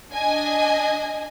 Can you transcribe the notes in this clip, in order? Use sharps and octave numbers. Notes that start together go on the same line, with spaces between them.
D4 D#5 G#5